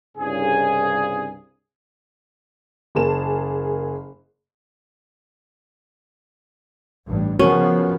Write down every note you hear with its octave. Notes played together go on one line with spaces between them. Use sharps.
C2 G2 C#3 G#4
F#1 A#3 G#4 A5 E7
A1 G2
C#3 F3 B3 C#4 F#4 A#4 B4